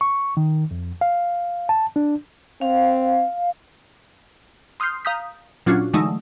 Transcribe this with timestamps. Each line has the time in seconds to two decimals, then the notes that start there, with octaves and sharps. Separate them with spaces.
0.01 C#6
0.37 D#3
0.71 F2
1.01 F5
1.69 A5
1.96 D4
2.61 C4 F5
4.80 C6 D#6 F6 G6 C7
5.05 F5 A#5 D#6 G6 B6
5.66 A#2 F#3 C#4 D4 F4 F#4
5.93 D3 E3 F#3 G#3 A3 D#4